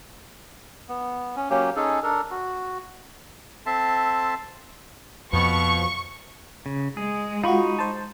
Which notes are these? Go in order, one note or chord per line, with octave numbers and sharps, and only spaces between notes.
B3
C#4
F#3 A#3 C#4 G4
C#4 D#4 G#4 A4
D4 A4 A#4
F#4
C4 A4 E5 A5 C6
F2 B2 F3 C#6
C#3
G#3 G#4
D#4 F4 F#4 B5 C#6
C5 A5